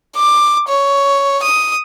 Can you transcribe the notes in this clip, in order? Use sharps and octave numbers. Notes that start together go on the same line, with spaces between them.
D6
C#5
D#6